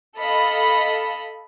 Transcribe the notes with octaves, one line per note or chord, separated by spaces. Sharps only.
A4 D#5 F5 B5